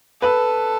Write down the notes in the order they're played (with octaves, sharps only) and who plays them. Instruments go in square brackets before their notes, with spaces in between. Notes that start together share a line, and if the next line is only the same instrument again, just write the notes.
[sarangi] A4 [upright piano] B4